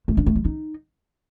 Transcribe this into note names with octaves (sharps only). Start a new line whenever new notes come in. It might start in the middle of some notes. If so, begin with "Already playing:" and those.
A3
D4
A3
F#3
D#4